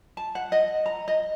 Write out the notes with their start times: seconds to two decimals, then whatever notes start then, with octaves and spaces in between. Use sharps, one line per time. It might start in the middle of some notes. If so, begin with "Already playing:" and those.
0.17 A5
0.35 F#5
0.52 D#5
0.86 A#5
1.08 D#5